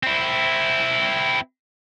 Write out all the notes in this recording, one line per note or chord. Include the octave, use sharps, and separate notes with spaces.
C4 E4